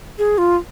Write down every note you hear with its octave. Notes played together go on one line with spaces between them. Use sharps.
G#4
F4